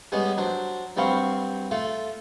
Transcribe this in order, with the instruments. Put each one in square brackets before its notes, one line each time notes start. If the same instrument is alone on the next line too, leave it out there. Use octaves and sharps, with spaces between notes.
[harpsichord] G3 G#3 B3 C#4
F#3 D4 C5
G2 F#3 C4 F5 B5 C#6
A3 F4 A4